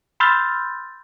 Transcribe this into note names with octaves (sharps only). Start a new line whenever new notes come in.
B5 C6 E6 F6 G6 A6